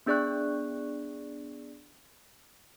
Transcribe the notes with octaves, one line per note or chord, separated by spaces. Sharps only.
B3 D4 G#4 D5 C#6 F#6